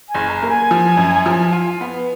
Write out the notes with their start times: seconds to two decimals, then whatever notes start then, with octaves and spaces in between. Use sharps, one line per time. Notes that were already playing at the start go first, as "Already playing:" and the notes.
0.09 G#5
0.15 F#1
0.29 A#5
0.43 A#3 A#5
0.49 G#5
0.71 F3
0.97 F#2
1.26 F3
1.52 F4
1.81 B3